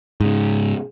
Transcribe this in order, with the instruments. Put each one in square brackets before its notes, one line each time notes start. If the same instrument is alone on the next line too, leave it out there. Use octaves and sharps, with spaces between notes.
[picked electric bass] G#2 C#3